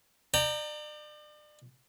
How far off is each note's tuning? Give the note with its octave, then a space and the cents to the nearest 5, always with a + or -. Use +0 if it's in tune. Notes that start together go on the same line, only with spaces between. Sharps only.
D5 +40 G5 +0 A#5 -15